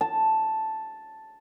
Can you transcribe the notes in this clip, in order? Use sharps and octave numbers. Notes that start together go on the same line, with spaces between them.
A5